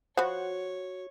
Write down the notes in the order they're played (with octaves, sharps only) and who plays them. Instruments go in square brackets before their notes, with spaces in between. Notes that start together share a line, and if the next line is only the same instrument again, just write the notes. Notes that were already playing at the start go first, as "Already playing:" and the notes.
[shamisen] F3 B5 [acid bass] F#4 [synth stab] C5 F#5 [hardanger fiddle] C#5